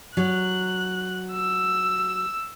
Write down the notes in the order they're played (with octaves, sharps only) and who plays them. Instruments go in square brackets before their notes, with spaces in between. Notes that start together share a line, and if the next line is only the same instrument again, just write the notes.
[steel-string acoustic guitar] F#3 [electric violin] F#6
[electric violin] E6